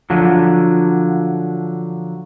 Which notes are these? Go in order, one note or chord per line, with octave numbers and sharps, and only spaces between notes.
D3 F3 F#3